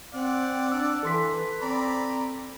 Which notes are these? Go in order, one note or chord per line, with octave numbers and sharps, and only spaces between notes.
C4 D5 F#5
D4 E6
E3 A4 C6 B6
B4
C4 D5 A#5 B5